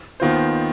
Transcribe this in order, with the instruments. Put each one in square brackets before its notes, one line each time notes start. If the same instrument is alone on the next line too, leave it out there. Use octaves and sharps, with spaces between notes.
[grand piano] D#2 D#3 B3 F4 C5